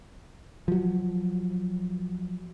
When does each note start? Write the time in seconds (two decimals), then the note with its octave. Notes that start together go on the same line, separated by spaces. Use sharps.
0.68 F3 F#3